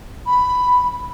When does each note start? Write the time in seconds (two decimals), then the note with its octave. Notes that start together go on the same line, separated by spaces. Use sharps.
0.26 B5